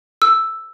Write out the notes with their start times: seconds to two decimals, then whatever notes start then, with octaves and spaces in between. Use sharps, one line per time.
0.22 E6